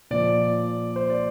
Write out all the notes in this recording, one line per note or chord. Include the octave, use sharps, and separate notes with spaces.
A#2 F3 D5
C5
D5